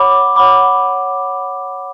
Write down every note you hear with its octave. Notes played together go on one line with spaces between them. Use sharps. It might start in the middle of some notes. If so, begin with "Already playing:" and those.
Already playing: C#5 F#5 B5 D6
C#5 F#5 B5 D6